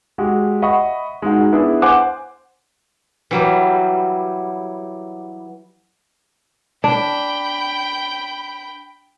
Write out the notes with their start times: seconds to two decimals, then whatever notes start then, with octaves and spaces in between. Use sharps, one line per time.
0.18 G#3 F#4 G4
0.62 D#5 E5 F#5 B5 C#6 D#6
1.22 G#3 D#4 F#4
1.52 B3 D4 E4 G#4 B4
1.82 C5 F#5 G#5 D6 F#6
3.31 E3 F#3 G3
6.84 D4 G5 B5